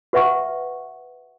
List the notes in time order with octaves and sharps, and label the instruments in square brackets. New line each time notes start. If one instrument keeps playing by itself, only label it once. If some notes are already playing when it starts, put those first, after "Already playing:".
[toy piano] F#4 B4 E5 F#5 C#6